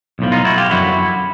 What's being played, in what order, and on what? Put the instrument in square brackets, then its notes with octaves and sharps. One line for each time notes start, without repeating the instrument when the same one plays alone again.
[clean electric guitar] B1 A2 F3
D#4 F4
E4 F#4
F4 G4
F#2 D3 F3 E4 F#4